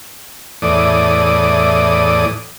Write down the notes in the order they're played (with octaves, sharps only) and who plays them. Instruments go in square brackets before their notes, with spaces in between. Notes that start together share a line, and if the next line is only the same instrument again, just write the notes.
[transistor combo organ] E2 A2 D5 D#6